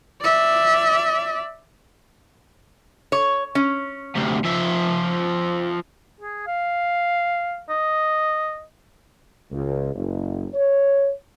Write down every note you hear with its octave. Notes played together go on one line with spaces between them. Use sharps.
D5 E5
C#5
C#4
D2 C3
F3 E5
G#4
F5
D#5
C#2
F#1
C#5